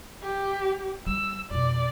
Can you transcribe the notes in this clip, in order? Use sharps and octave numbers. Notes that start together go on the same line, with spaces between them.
G4
G3 E6
F2 B2 D5